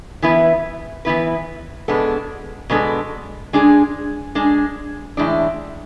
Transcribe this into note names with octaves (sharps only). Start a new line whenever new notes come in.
E3 B3 E4 B4
E3 B3 E4 B4
B2 G#3 B3 D4 A4
B2 G#3 B3 D4 A4
G#3 D4 G#4
G#3 D4 G#4
A2 E3 G#3 D4